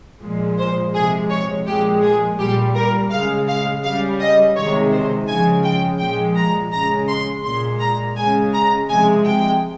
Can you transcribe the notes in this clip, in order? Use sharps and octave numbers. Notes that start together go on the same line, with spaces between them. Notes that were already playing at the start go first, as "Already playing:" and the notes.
A#2 F3 G#3
C5
C3 F3 G#3 G#4
C#5
A#2 F3 G#3 G4
G#4
A#2 G3 G4
A#4
C#3 G#3 F5
F5
C#3 G3 F5
D#5
C3 D#3 G#3 C#5
C5
C#3 F3 G#3 G#5
G5
A#2 F3 G#3 G5
A#5
C#3 G#3 A#5
C6
A#2 G#3 C6
A#5
C#3 G#3 G#5
A#5
C3 F3 G#3 G#5
G5